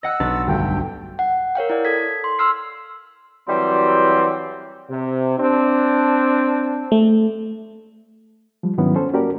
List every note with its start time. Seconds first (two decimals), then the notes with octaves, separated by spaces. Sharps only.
0.03 D#5 F#5 E6 F#6
0.20 B1 D4
0.47 D2 G2 G5
1.19 F#5
1.55 A#4 C#5 F5 G5
1.70 E4 D5
1.85 A4 G#6 B6
2.24 C6
2.39 C6 E6 F6 C7
3.48 E3 F#3 G3 C4
4.90 C3
5.38 C4 D4
6.92 A3
8.63 F3 G3
8.78 G#2 D#3 F#3 B3 C#4 E4
8.96 C#4 A4 C5
9.13 A#3 C#4 F#4 G4 A#4 D5